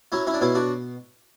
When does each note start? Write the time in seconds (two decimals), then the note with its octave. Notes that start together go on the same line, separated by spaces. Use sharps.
0.12 F#3 C#4 E4
0.27 C#4 E4
0.34 D4
0.41 B2 C#4 E4
0.55 D4 F#4